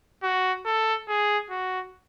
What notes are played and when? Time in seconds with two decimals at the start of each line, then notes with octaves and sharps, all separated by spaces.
0.23 F#4
0.65 A4
1.08 G#4
1.50 F#4